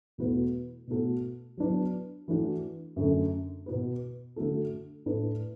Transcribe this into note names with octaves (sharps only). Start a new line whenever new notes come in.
E2 B2 A3 F#4 B4
B2 A3 F#4 A4
F#3 B3 D4 B4
E3 A3 D4 F#4
F#2 D3 A3
B2 B3 F#4 B4
D3 A3 F#4 A4
A2 A3 D4 B4